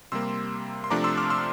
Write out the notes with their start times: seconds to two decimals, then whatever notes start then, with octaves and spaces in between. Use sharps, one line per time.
0.12 C3 G3 A#3 C6 E6
0.84 C6
0.90 C3 F3 A3 D4 A#5 D6
1.04 C6 E6
1.17 D6 F6
1.30 C6 E6